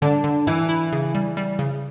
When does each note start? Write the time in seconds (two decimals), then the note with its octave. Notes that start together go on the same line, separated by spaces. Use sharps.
0.02 D3 D4
0.24 D3
0.47 E3 E4
0.69 E4
0.93 C#3
1.15 G3
1.37 G3
1.59 C#3